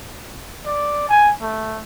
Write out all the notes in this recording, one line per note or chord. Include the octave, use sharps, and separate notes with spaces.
D5
G#5
A3